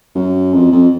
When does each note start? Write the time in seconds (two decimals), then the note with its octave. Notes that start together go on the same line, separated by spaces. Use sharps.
0.15 F#2
0.54 F2
0.72 F2